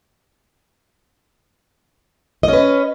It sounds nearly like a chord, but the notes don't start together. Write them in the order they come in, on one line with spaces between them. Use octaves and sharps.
D#5 C#4 B4